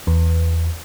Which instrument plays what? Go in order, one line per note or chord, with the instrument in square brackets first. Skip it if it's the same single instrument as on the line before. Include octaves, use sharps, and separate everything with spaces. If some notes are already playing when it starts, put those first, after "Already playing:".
[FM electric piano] E2